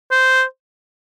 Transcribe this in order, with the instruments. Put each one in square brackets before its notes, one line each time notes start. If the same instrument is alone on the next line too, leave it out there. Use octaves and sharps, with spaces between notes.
[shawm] C5